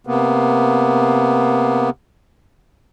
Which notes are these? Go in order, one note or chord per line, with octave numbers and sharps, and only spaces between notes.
C3 A#3 B3